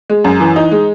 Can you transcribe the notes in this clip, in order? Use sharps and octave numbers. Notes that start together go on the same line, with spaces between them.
G#3
F#2
E3
D#4
G#3